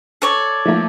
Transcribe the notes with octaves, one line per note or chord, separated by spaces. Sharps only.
A4 C#5 D5
F3 A3 A#3